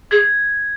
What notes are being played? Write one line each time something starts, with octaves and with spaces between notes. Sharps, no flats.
G#4 G#6